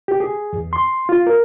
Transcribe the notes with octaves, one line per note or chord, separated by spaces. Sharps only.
G4
G#4
E2
C6
F4
A#4